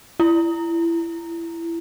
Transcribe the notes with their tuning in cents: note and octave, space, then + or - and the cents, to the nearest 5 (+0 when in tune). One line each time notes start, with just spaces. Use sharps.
E4 +25